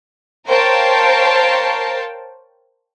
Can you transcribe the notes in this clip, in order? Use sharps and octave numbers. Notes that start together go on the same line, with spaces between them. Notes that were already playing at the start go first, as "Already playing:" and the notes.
A#4 C5 C#5 F5 G5 A5